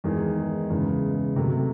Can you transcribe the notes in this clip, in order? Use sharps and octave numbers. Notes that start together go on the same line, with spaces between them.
E2 D#3 G#3 D#4 G#4
E2 C#3 G#3
C3 F#3 A3